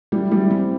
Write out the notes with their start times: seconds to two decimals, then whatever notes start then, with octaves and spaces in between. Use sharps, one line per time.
0.12 G3 E4
0.32 G3 E4
0.51 C4